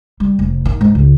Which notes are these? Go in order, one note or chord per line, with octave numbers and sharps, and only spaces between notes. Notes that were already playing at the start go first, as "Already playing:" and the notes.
G3
F1
D#3
G#2
C#2